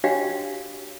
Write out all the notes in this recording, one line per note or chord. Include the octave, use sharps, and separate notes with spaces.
D4 F#4 G4 C#5 F5 G5